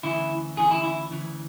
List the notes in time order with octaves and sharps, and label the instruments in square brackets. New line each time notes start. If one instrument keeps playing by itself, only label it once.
[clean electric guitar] D2 C#3 E3 E4
D2 C#3 E3 G#4
E4
E4
D2 C#3 E3